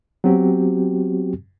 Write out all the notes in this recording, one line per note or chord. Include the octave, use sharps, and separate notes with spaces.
F#3 B3 C4 F#4 G4